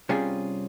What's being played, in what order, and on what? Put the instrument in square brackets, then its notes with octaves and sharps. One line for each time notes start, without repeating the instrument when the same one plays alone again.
[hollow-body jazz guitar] C3 G3 C#4 F4 G#4